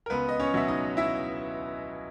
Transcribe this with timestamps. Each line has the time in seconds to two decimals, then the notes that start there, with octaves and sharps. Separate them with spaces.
0.06 A#4
0.10 C#2 B3 B4
0.29 D#5
0.40 C#4 C#5
0.54 B2 F#3 E5
0.68 D#4 D#5
0.97 E4 E5